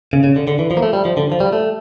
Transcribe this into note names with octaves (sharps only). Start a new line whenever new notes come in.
C#3
C#3
D3
D3
E3
F3
A#3
A3
G3
F3
D3
F3
G3
A3